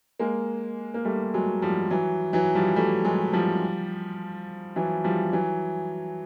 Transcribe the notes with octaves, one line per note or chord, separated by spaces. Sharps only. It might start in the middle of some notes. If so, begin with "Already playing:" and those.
G#3 A#3
A#3
G3 A3
F#3 G#3
F3 G3
E3 F#3
E3 F#3
F3 G3
G3 A3
F#3 G#3
F3 G3
E3 F#3
F3 G3
E3 F#3